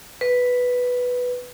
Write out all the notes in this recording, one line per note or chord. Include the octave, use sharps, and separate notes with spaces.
B4